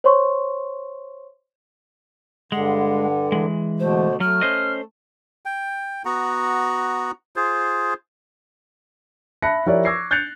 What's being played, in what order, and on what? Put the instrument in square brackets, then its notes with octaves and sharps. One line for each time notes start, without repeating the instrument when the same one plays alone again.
[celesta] C5 C#5 C6 C#6
[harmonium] G2 D3 [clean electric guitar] G#3 [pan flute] F#5
[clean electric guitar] E3 G#3
[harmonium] B2 D3 A3 [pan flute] C5
[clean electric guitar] F#3 [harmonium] A3 [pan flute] F6
[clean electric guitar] C#4 C5 D#5
[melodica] G5
B3 F#4 F#5 A#5
F4 G#4 C5
[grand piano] E5 A5 B5 F#6 A#6 C#7
F3 E4 G4 A#4 C#5 D5
C#6 D6 E6 G#6 A#6 C7
F#6 G6 A6 C7 C#7 F7